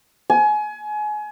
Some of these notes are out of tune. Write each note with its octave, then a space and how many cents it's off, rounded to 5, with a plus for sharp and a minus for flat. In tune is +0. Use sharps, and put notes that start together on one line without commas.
G#5 +30